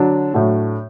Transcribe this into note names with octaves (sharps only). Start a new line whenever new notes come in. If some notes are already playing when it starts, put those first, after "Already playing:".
Already playing: D3 F#3 D4
A2 F#3 A3 D4 F#4